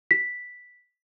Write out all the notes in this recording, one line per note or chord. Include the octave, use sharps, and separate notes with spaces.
B6